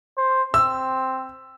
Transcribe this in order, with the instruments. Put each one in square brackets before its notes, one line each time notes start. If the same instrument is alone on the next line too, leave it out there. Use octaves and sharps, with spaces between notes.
[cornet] C5
[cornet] C4 [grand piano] E6